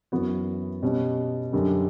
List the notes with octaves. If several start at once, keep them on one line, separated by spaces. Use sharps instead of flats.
F#2 E3 B3 F#4
B2 G3 C#4
F#2 D3 G3